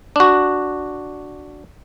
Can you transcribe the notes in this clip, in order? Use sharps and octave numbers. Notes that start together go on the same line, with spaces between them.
D4 F#4